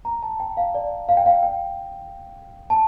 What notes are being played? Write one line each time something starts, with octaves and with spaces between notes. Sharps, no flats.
A#5
A5
G5
F5
D5
F5
G5
F5
G5
A5